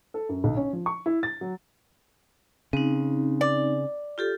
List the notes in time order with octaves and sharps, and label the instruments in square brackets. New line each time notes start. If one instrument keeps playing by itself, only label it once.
[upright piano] A4
F#2
B1
C#4
F3
C#6
E4
A6
F#3
[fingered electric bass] C#3 [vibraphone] C4 D#4
[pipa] D5
[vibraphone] F4 G4 A4